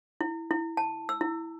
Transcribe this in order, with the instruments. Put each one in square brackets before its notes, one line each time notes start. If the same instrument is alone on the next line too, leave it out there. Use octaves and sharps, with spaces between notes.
[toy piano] E4
E4
A5
E6
E4